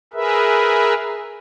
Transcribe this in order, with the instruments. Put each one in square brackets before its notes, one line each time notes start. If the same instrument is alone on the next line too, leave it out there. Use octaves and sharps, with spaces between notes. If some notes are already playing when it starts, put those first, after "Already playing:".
[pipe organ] G#4 A#4 B4 E5